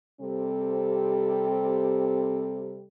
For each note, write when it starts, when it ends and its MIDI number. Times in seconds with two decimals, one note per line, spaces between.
0.21 2.85 48
0.21 2.85 55
0.21 2.85 60
0.21 2.85 69